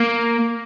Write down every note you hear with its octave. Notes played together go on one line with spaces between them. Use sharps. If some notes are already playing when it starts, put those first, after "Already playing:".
Already playing: A#3